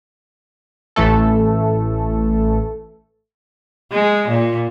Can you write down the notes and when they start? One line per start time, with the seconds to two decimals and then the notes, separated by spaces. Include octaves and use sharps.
0.96 A1 E3 A3 A4
3.92 G#3
4.28 A#2